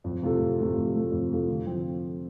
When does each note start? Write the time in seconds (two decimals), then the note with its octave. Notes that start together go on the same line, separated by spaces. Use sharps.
0.04 F2
0.23 C3 A3 F4 A4
0.40 F2
0.59 C3 A3 F4 A4
0.76 F2
0.95 C3 A3 F4 A4
1.12 F2
1.30 C3 A3 F4 A4
1.48 D3
1.66 F3 C4